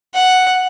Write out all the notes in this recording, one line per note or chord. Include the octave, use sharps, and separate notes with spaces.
F#5